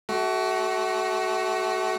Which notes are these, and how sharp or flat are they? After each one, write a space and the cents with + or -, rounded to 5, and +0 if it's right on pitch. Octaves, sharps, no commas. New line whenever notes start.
A3 -20 F#4 +25